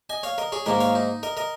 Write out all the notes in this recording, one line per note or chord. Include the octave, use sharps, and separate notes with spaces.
D#5 G#5
C#5 F5
A#4 D#5
G#4 C#5
G#2 D#3 A#3 A#4 D#5
C#5 F5
D#4
A#4 D#5
A#4 D#5